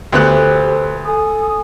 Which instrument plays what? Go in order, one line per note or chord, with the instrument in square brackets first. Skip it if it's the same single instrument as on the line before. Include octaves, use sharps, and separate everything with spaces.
[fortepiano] D2 B3 F#6 [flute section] G4 A4 C5
[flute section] A4 G#5 D#6